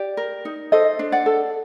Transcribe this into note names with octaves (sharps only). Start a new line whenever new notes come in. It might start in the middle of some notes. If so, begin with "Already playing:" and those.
Already playing: G4 D5
A#4
D#4
A4 C5 D#5
D4
D5 F#5
A4